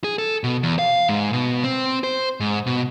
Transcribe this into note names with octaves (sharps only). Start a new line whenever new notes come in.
G#4
A4
B2
E2
F5
G#2
B2
C4
C5
G#2
B2